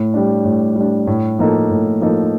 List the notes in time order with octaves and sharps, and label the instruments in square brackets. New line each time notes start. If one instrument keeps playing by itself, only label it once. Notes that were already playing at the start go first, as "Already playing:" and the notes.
Already playing: [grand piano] A2
G3 D4
A2
G3 D4
A2
F3 A#3 D#4 A4
A2
F3 A#3 D#4 A4